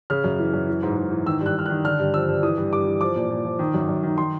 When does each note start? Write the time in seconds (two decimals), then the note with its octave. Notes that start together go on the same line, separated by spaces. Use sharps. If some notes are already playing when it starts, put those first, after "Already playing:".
0.10 C#3 F6
0.24 F#2
0.39 E3
0.53 F#2
0.68 E3
0.83 G#2
0.97 G#2
1.11 E3
1.26 D#3 E6
1.41 G2
1.46 F#6
1.55 G2 F6
1.66 D#3 F#6
1.84 D3 F6
1.99 G2
2.14 F3 E6
2.29 G2
2.43 E3 D#6
2.58 G2
2.72 G2 D6
2.87 E3
3.01 F3 D6
3.16 A#2
3.31 A#2
3.45 F3
3.59 D#3
3.74 F#2
3.89 F#2
4.03 D#3
4.17 D#3 C6